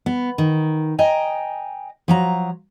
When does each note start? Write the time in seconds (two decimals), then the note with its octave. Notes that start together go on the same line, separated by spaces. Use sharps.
0.06 B3
0.38 D#3
0.98 D#5 G5 G#5 A#5
2.08 F3 F#3 A#5